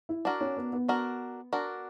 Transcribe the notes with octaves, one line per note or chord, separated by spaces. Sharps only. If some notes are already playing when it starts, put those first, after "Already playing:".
E4
D4 F#4 A#4
C#4
B3
B3
D4 F#4 A#4
D4 F#4 A#4